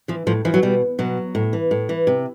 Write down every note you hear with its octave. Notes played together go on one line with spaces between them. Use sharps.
E3 F3
A2 F3
E3 F3
F#3
B2 G3
B2 F#3
A2
E3
A2
E3
C3